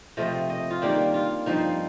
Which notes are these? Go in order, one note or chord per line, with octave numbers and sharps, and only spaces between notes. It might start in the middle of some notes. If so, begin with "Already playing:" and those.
C3 F3 A3 C4 D#5
D#5
F4
D#3 G3 A#3 D4 G4
F4
G2 F3 C4 D#4